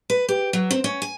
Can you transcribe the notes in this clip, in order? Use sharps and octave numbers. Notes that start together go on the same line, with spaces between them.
B4
G4
F#3
C4
C#4
G#5